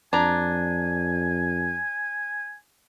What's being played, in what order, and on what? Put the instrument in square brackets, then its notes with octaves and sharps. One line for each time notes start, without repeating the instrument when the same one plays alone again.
[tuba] F2 [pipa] D4 A#5 [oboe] G#5